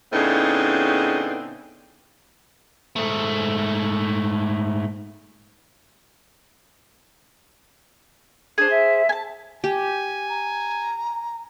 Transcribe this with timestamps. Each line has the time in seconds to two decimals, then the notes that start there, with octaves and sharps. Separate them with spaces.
0.13 A2 C#3 B3 C4 D4 D#4
2.96 G#2 A3
8.58 D4 G#4 C5
8.70 E5
9.09 G#5 A5
9.64 G4 G#5
10.30 A#5